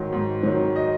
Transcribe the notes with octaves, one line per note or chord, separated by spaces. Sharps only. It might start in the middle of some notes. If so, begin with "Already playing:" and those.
Already playing: G#2 D#3 F#3
G#2
D#3 F#3
D#5